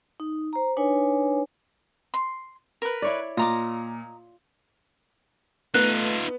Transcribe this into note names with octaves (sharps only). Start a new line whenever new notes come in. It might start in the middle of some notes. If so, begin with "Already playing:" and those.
D#4
C5 A#5
D4 D#4 B4 C#5 G#5
C6
A#4 B4
E4 C#5 D5
A#2 F4 D#5 A#5 D6
A3 B3 D#4 F4 F#6